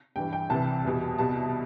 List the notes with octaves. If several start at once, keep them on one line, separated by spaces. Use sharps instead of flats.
G2 E3 G3 G5
G5
C2 C3 E3 A5
E2 B2 G3
C2 B2 G3 A5